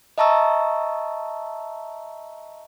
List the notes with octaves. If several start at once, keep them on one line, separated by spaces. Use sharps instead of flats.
D#5 E5 A5 A#5 C#6 E6